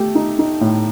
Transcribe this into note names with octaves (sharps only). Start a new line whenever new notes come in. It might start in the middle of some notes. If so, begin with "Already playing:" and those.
Already playing: A3 G4
D#4
D#4
A2